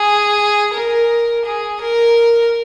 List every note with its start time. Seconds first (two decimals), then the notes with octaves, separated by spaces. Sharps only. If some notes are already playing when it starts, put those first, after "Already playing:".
Already playing: G#4
0.74 A#4
1.45 G#4
1.81 A#4